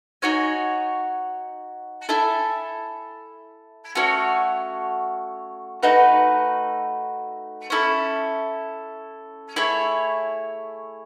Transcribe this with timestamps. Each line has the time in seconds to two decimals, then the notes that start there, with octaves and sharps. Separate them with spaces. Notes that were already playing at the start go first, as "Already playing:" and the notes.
0.22 D#4 F#4 C#5 G#5
2.09 E4 A4 E5 G#5
3.95 A3 C#4 F#4 C#5
5.83 A3 D#4 F#4 B4
7.70 C#4 E4 A4
9.56 A3 E4 G#4 C#5